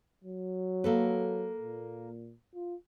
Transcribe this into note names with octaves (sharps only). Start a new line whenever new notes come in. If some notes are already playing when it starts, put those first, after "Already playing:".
F#3
A#3 A4 B4
A#2
F4